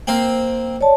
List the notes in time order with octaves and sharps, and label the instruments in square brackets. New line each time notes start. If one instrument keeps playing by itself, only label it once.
[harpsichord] A#3 C4
[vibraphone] C#5 D5 A5